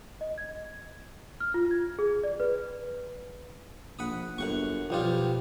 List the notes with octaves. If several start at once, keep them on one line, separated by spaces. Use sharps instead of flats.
D#5
G#6
F6
F4
G#6
G#4
D5
B4
A#1 F#5 B5 D#6
G1 F#2 F#5 C#6
B1 F3 G3 F4